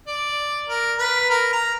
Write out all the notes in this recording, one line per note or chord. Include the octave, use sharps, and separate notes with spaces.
D5
A#4
B4
A#4
A#5